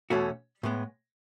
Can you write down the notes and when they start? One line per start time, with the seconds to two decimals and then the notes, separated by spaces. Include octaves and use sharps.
0.10 E2 B2 A3 C#4 F#4
0.63 A2 G#3 B3